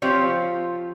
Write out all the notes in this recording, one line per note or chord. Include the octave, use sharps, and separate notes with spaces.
F3 C4 F4 G4 C#5